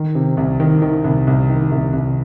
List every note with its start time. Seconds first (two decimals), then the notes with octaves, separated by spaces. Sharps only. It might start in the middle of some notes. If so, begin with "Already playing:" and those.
Already playing: D#3
0.15 C3
0.37 C2
0.60 D#3
0.82 D#3
1.04 C2
1.27 C2
1.49 D#3
1.71 C2
1.93 C2